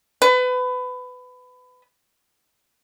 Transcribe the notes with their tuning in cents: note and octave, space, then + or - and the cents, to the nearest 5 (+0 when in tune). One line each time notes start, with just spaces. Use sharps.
B4 +25